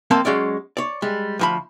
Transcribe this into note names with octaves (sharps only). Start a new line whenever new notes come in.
F2 A#3 C4 A5 C6
F#3 G#3 C#4 D5
C#5 D5
G3 G#3
D2 F3 B5